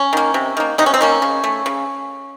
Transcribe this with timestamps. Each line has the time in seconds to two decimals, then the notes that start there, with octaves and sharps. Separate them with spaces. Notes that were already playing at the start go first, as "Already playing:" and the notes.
Already playing: C#4
0.13 D#3 A#3
0.34 C3
0.57 D#3 A#3
0.78 C3 D#4
0.86 C#4
0.94 C4
1.01 D#3 A#3 C#4
1.22 C#3
1.44 A3
1.66 C#3